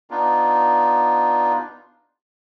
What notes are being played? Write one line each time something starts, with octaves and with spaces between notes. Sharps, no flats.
B3 D4 D#4 F4